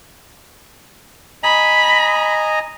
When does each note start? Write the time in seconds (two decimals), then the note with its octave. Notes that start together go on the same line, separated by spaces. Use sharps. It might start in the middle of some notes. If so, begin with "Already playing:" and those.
1.43 D#5 G#5 A#5 B5